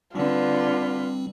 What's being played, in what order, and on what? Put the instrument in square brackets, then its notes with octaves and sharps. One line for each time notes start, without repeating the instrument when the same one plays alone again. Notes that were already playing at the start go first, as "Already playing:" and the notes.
[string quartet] D3 B4 [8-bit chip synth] G3 C4 [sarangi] F4